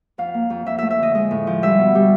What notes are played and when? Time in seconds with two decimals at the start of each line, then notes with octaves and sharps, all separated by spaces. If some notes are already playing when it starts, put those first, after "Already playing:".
0.18 F2 F5
0.34 A#3
0.50 F2
0.66 F2 E5
0.78 A3 E5
0.90 E5
0.99 D3 D#5
1.15 G#3 D#5
1.31 A2
1.47 F3
1.62 G3 E5
1.79 B2
1.95 G3